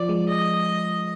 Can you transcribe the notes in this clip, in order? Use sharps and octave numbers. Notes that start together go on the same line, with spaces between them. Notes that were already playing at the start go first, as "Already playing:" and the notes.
Already playing: F3 D5
G#3
D#5